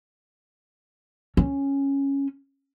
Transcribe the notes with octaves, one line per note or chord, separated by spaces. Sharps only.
C#4